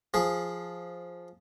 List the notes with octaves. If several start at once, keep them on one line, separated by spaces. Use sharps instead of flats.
F3 G#4